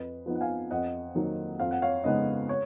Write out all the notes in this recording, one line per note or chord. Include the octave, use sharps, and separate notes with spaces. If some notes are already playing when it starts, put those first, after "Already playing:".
Already playing: F2 B4 D#5
F3 B3 D#4
F#5
F5 G#5
F2 D#5 F#5
D#3 F#3 A#3 D#4
F2 F5
F#5
C#5 F5
C#3 G#3 B3 D#4 B4 D#5
C#5